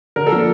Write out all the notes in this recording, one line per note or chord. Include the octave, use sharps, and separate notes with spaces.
D3 A#4
A4
F3 A#3 D4